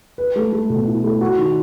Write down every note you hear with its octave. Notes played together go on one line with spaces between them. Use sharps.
B4
A3
A3
B2
E4
A3
F#4
D#3